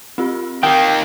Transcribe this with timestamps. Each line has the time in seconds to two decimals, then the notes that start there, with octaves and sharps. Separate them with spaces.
0.18 C4 F4 G4
0.63 D#3 A#3 G5